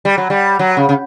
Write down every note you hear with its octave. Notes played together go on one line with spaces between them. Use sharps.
G3
F#3
G3
F#3
C#3
C#3